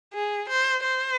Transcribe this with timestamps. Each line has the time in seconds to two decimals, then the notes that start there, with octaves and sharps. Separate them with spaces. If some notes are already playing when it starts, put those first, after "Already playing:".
0.14 G#4
0.50 C5
0.84 C5